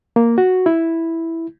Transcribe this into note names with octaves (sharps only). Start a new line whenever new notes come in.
A#3
F#4
E4